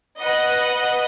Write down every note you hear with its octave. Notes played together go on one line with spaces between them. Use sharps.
B4 D#5 F#5